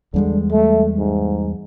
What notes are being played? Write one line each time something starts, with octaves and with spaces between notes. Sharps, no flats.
E2 D3 G3 G#3
A3
G#2